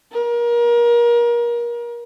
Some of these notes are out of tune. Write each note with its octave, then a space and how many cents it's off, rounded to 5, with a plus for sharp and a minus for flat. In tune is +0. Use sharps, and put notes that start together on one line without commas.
A#4 +30